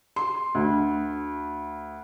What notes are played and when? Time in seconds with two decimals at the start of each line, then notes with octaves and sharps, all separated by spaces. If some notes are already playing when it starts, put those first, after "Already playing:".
0.16 C6
0.55 D2